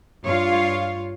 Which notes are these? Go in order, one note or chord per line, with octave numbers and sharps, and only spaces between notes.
G2 F4 C#5 F5